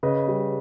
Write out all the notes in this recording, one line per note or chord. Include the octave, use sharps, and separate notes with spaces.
C#3 B4 D#5
G3